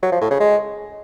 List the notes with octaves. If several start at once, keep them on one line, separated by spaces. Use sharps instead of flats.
F#3
F3
A2
C#3
G#3